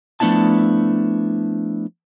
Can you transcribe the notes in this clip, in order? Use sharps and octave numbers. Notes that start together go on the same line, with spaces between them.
F3 A3 B3 D4 E4 A5